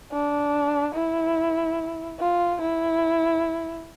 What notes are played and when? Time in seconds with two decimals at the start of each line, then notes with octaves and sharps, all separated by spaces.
0.12 D4
0.94 E4
2.19 F4
2.61 E4